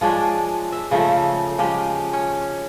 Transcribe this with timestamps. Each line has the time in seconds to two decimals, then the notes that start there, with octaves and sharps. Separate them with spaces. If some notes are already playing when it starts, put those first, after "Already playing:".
0.01 F3 G#3 D4 C#5
0.72 E5
0.91 C#3 F3 A3 D#4
1.58 F3 G#3 G4
2.13 C#4